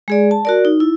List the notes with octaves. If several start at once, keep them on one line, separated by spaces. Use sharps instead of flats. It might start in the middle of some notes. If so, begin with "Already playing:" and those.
G#3 G#4 D5
A5
F#4 A#4 D5
D#4
E4